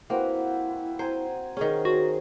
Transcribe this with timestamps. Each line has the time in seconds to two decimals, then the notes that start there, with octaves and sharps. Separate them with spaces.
0.10 A#3 C4 E4 F#4 B4
0.99 C4 C5 G#5 A#5
1.57 D#3 C#4 G#4
1.85 F#4 C6 D#6